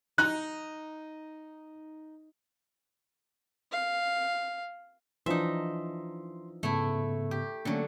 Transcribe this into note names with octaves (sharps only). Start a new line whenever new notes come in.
D#4 F#6
F5
E3 F3 D4 D#4 E5 C6
G#2 C#3 A3 B3 E4
G4
D3 F#3 A3 A#3 C#4